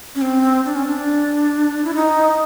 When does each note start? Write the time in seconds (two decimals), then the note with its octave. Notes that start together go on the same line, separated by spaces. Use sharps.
0.15 C#4
0.21 C4
0.65 D4
0.76 C#4
0.86 D4
1.84 E4
1.95 D#4